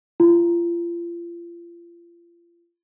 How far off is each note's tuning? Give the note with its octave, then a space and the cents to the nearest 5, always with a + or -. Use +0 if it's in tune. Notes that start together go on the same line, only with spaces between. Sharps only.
F4 -35